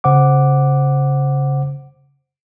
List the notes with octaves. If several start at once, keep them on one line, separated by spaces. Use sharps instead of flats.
C#3 C5 F#5 D6